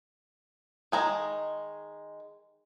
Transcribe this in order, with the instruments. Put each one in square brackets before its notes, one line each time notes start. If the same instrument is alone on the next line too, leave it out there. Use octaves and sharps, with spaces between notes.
[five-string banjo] D#3 G#3 A#5